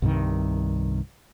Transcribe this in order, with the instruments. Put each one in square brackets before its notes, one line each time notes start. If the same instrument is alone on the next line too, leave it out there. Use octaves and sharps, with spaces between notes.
[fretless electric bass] C2 G2 C3 D#3